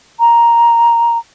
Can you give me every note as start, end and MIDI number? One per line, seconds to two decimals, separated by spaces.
0.20 1.18 82